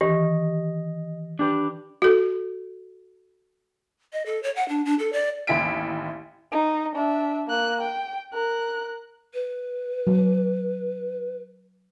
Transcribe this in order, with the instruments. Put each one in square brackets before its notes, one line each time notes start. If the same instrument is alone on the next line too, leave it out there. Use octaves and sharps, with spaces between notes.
[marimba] D#3 E3 [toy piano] G4 [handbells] D#5
[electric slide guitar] D4 G4 B4
[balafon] F#4 A4
[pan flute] D#5
A4
C#5
F#5
D4
D4
A4
D5
[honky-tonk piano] A1 D#2 E4 G#5 B6 D7
[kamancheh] D#4
D4 E5
A#3 F#6
G5
A#4 F#6
[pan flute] B4
[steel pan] F#3